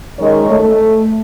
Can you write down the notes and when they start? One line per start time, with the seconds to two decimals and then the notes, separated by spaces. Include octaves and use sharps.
0.19 F#2 D#3 G#3 A#4 C#5 D#5
0.50 A3